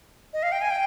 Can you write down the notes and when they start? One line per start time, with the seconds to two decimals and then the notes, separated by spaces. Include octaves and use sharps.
0.33 D#5
0.43 F5
0.52 G5
0.61 G#5
0.70 G5